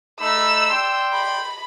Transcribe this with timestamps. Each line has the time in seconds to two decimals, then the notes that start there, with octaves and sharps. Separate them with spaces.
0.20 A3 D#4 B5 E6
0.70 D5 G5 C6
1.13 B5